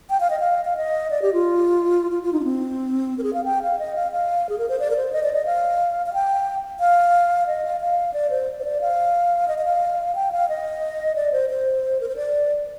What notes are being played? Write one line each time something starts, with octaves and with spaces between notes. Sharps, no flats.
G5
F5
D#5
F5
F5
D#5
D5
G4
F4
F4
F4
D#4
D4
C4
A#4
G#4
F5
G5
F5
D#5
F5
F5
G#4
A#4
C5
D5
A#4
C5
D#5
D5
D#5
F5
F5
G5
F5
D#5
F5
F5
D5
C5
C5
D5
F5
D#5
D#5
F5
G5
F5
D#5
D5
C5
C5
A#4
C5
D5